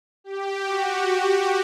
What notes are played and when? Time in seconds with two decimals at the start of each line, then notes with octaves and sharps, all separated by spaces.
0.24 G4
0.63 F#4